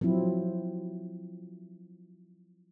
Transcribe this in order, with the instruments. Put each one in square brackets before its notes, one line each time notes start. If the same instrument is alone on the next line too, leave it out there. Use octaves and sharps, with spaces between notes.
[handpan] F3 F#3 C4 E4